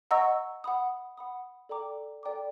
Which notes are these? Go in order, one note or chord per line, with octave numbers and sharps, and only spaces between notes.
D#5 F#5 A#5 C#6 E6
F#5 B5 D#6
F#5 B5 D#6
A4 D5 G5 A#5 D6
A4 D5 G5 A#5 D6